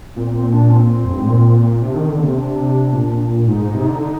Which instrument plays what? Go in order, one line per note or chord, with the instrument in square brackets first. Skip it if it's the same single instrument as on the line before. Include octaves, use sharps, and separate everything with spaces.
[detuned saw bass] A#2 [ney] C4
[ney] C4
D4
C4
[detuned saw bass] F2
G2
G#2
A#2
[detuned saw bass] C3 [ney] D4
[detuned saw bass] D#3 [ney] C4
[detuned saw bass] D3
[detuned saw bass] C3 [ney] A#3
[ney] C4
D4
[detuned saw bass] A#2
[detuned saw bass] G#2 [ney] D#4
[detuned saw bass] G#2
C3
D3
[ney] D#4